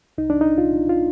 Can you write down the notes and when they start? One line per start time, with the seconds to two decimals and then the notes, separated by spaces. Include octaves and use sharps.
0.18 C2 D#4
0.30 D4
0.41 D#4
0.58 C2 F4
0.89 F4